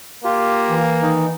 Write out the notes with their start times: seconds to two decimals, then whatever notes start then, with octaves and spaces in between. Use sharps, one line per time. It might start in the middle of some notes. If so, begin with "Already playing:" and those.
0.24 A#3 F4 G4
0.70 E3
1.02 D#3 D#4